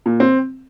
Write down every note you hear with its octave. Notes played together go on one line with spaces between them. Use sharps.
A#2
C4